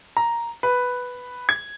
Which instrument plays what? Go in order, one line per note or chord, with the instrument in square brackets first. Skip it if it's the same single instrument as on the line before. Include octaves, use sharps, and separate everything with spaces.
[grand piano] A#5
B4
G#6